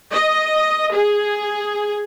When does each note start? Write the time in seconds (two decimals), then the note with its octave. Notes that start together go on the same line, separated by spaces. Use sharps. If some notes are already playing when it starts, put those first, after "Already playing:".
0.12 D#5
0.94 G#4